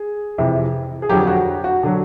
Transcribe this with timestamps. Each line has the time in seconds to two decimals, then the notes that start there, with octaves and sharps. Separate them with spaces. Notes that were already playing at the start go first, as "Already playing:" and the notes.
Already playing: G#4
0.38 F2 C3 E3
1.02 G#4
1.09 F2 D3 F#3 G4
1.27 F#4
1.64 F#4
1.83 D3 F#3